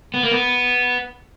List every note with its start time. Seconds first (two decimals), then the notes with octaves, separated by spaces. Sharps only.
0.14 B3
0.23 A#3
0.31 B3